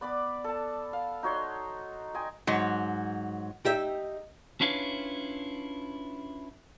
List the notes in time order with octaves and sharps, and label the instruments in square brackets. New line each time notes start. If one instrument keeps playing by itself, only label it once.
[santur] B3 D5 B5 D6
A4 A5
F5
D#4 F#4 C#5 C6
D#5 G5 G#5 C6
[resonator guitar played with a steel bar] G#2 F#3
[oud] D#4 G4 E5
[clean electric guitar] C#4 D4 E4 F4 B4 C#5